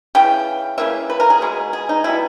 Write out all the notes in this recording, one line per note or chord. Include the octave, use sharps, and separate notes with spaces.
C#3 E3 G5
C#3 E3 A#3 E5
B4
A#4
G#4
B2 G#3 B3
G#4
D#4
B2 G3 B3 E4